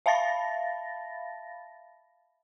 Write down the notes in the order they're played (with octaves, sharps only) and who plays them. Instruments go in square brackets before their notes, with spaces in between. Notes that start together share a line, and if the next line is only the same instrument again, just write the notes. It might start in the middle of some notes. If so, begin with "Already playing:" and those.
[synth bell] E5 F5 A5 B5 A6 A#6